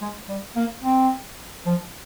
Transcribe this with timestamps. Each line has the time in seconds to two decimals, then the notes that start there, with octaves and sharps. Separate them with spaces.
0.01 G#3
0.28 G3
0.56 A#3
0.84 C4
1.66 F3